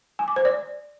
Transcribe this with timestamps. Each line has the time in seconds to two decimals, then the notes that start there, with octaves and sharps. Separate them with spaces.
0.19 G#5
0.28 D6
0.36 C5
0.45 D5